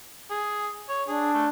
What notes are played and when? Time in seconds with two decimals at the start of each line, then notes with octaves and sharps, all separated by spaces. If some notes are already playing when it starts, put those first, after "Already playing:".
0.31 G#4
0.89 C#5
1.08 D4 G#4
1.34 A3